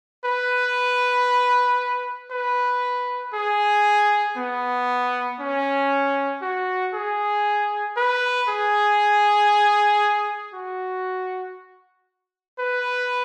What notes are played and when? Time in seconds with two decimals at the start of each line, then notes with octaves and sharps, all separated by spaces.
0.25 B4
2.31 B4
3.34 G#4
4.37 B3
5.40 C#4
6.42 F#4
6.94 G#4
7.97 B4
8.49 G#4
10.54 F#4
12.59 B4